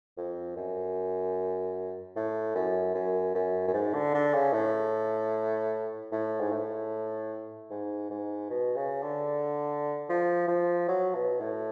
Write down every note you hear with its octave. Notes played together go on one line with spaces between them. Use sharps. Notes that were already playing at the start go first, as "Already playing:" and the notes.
F2
F#2
A2
F#2
F#2
F#2
F#2
G#2
D3
D3
C#3
A2
A2
G#2
A2
G#2
G#2
B2
C#3
D3
F3
F3
F#3
B2
A2